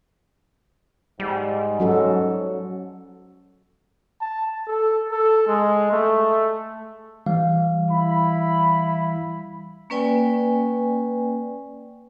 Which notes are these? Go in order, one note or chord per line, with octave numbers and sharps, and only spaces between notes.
G#2 G3
F#3 C#4 F#4 A4
A5
A4
A4
G#3
A3
E3 G3 F5
E4 B5
A#3 C#4 B4 D5 G5 G#5